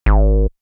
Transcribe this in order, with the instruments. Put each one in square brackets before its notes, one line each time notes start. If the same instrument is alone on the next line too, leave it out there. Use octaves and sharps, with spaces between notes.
[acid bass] G#1